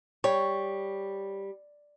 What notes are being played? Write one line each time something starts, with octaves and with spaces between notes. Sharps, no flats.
G3 C#5